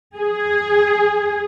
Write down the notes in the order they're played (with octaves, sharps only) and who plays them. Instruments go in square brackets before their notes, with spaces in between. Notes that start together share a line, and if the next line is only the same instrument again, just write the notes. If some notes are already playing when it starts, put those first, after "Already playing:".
[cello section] G#4